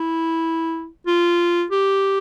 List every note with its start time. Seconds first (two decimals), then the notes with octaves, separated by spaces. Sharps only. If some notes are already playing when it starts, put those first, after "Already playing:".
Already playing: E4
1.07 F4
1.71 G4